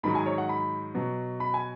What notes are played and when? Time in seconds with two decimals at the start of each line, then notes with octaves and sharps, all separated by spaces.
0.03 G#2 D#3 F#3 B5
0.15 G#5
0.26 C#5
0.38 F#5
0.49 B5
0.95 B2 F#3
1.40 B5
1.54 G#5